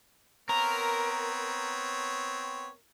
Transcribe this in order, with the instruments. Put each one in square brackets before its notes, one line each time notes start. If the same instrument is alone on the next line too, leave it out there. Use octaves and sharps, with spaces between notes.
[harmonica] B3 C4 C#5 [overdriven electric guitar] A#4